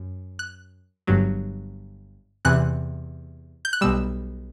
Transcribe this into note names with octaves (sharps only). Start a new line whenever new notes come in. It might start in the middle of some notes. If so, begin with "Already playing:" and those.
Already playing: F#2
F#6
G1 G2 F#3
E2 C3 E3 F#6
G6
F#6
B1 B2 G3 E6